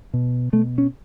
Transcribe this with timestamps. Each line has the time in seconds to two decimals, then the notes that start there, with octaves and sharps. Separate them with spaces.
0.14 B2
0.53 B2 A3
0.78 C#4